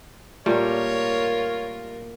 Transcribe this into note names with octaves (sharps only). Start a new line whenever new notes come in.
A#2 G3 A3 F4 A#4 C#5